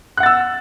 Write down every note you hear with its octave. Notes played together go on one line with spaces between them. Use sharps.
F#5 E6 F#6 A6